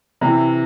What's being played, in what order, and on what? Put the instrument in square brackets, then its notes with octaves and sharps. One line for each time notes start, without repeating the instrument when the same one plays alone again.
[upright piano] C3 E3